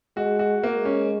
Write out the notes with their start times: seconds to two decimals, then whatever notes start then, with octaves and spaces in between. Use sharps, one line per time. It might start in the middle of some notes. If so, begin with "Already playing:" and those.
0.17 G#3 F#4
0.39 F#4
0.63 G#3 A#3
0.85 C#4